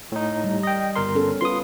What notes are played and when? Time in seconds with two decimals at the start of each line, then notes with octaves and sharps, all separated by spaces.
0.12 A2 D#4
0.44 G3
0.63 D#5 G5
0.96 G1 A#4 C6
1.14 B3 C#4 A4
1.41 C#4 F4 B4 C6 D#6